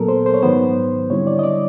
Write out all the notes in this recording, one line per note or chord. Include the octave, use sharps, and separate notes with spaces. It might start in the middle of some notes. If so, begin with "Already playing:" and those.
Already playing: A#2 F#3 B3 A4 A#4
C5
C5
C#5
G#2 D#3 F#3 B3 C5
D3 G3 C4 E4 C#5
D5
D#5
D5